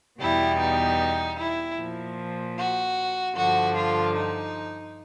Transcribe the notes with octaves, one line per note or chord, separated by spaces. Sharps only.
E2 B2 G3 E4
D#4
E4
A#2 F3
F#4
G2 D3 F3 F#4
F4
D#4